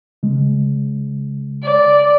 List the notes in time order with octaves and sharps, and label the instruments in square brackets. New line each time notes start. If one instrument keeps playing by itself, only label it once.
[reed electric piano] C#3 G#3
[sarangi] D5